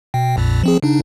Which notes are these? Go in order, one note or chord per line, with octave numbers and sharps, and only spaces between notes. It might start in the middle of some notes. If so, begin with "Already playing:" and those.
B2 G5
A#1 F2 A#2
F3 C4 G#4
C#3 D4 D#4